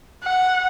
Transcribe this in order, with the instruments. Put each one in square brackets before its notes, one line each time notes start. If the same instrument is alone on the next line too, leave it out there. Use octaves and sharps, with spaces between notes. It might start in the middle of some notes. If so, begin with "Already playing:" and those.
[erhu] F#5